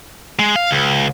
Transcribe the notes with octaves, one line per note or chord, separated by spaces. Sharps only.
G#3
F5
C#2